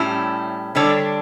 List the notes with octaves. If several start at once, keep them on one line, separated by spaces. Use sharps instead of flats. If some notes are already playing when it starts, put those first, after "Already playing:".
Already playing: A2 G3 C#4 E4
D3 G3 D4 A4 C#5